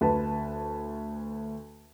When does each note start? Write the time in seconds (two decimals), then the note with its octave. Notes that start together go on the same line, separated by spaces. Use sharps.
0.01 D2 B4 A5